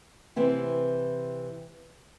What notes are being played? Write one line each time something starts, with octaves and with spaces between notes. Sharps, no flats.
C3 E3 C4 E4